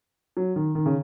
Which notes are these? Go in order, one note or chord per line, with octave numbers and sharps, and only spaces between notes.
F#3
D#3
D#3
C#3